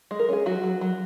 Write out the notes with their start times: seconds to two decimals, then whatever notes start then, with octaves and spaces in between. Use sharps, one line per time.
0.11 G#3
0.19 A#4
0.29 C#4 G#4
0.46 F#3 F#4
0.64 F#3
0.81 F#3